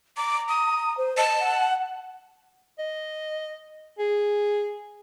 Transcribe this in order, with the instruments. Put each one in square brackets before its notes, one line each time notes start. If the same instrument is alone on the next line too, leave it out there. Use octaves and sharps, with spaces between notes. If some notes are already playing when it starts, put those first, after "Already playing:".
[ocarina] A#5 [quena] D6
[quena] D#6
[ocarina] C5
[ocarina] D#5 [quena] A5
[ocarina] F#5
[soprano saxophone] D#5
G#4